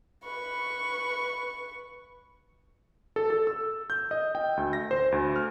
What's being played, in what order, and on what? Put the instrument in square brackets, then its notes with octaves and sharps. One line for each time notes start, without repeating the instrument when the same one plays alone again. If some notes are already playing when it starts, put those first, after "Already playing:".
[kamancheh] B4 C#6
[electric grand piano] A4
A4
E6
G6
D#5
G5
D2
A#6
C5
D2
F6